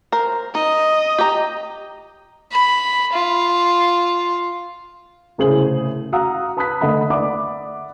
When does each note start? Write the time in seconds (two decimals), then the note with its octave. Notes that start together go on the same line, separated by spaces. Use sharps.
0.12 A#4 C5
0.55 D#4 D#5
1.18 G4 A#5
2.52 B5
3.13 F4
5.38 C2 A2 C#3 G#4 C5 F#7
6.13 F#4 F5 F#5 A#5 D#6 E6
6.57 B4 A5 B5 D#6 F#6 B6
6.81 D3 A3 D#5 F#5 B5
7.10 D5 E5 F#5 B5 D6